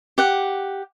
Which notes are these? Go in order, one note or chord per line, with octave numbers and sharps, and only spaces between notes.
G4 F#5